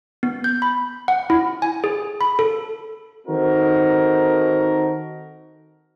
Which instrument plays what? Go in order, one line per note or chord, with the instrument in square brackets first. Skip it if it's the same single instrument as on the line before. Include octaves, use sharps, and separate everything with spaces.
[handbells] B3
G6
B5
F#5
E4
G#5
G#4
B5
A4
[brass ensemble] D#3 C4 D#4 F#4 A4 A#4